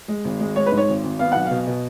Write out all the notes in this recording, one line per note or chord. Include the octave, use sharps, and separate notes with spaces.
G#3
G#1
G#3
G#3 C#5
B4
G#2
C#5
G#1
G#1
B3 F5
B1 F#5
F5
B2
B2